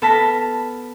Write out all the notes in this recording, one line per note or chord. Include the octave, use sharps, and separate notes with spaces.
B3 A4 A5 F6 A#6 B6